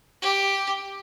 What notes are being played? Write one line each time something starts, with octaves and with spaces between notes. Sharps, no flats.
G4